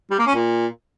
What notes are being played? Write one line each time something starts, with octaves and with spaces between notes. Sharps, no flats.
G3
A#3
C#4
A#2